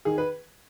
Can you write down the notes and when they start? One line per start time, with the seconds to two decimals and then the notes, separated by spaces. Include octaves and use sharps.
0.05 D#3 G#4
0.18 B4